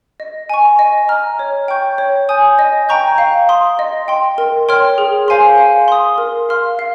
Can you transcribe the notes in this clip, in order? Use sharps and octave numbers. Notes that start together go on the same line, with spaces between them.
D#5
G#5 C#6
D#5
A#5 F6
C#5
G5 C#6 G6
C#5
G#5 D#6 G6
D#5
G5 A#5 C#6 G6
F5
C6 D#6
D#5
G5 C6
A#4
C#5 G5 C6 F6
G#4
C5 F5 G#5 C6
F5
C6 D#6
A#4
F5 C6 F6
F5